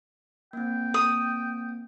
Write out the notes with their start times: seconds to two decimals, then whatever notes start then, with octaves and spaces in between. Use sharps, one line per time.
0.53 A#3 C4 G5
0.94 D#6